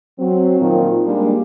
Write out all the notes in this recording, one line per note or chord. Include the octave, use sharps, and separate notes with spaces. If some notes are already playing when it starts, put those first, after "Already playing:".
F#3 C4
A#2 D#3 F3
G3 G#3 A#3 D4